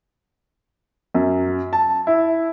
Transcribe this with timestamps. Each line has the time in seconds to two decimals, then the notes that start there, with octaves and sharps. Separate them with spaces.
1.14 F#2
1.73 A5
2.07 E4